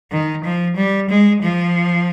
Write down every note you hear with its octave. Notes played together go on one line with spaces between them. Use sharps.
D#3
F3
G3
G#3
F3